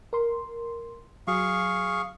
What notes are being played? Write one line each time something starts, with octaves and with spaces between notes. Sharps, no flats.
A#4 C6
F#3 G#4 F5 C#6